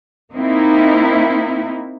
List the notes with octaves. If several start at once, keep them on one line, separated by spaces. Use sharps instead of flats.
A#3 C4 D#4 E4